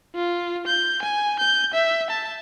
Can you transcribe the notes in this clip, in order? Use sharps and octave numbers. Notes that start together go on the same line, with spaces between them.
F4
G6
G#5
G6
E5
A5